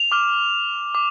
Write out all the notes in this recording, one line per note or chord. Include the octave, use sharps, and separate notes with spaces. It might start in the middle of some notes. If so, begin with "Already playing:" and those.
Already playing: F7
D6 F6
D6